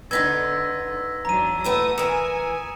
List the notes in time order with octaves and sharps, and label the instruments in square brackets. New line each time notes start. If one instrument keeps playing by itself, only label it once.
[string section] D3 [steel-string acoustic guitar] B3 D#4 F4 [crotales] E6 A#6 B6 [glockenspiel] G#6
[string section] E2 F#3 D4 [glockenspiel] A#5 D#7
[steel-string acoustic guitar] A3 B3 E4 [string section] D#6
[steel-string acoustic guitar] E3 A#4 [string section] G#5 [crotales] D#6 C#7 E7